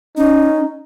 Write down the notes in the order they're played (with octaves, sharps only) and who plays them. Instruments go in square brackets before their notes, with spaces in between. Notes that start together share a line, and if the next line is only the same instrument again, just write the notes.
[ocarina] C#4 [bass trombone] D#4